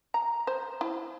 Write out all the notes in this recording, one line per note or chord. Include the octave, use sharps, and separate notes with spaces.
A#5
C5
E4